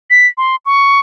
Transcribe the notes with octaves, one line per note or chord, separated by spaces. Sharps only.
B6
C6
C#6